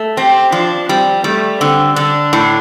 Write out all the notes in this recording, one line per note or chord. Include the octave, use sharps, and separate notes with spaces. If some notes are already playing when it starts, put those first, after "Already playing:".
Already playing: A3
C4 G4
F3 D4
G3 C4
G3 A3
D3 C4
D3 D4
A2